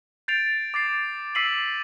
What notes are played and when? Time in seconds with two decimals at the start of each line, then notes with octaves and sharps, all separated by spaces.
0.28 G6 A6 C7 D7 F7
0.74 D6 A6 C7
1.35 D6 E6 B6 C7 D#7 F#7